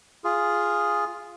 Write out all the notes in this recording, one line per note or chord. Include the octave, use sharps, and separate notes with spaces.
F4 G#4